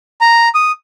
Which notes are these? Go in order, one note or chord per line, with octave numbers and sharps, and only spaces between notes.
A#5
D#6